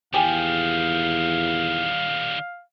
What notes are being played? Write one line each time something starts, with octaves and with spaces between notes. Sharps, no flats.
E2 D#3 G3 G4 G#4 F5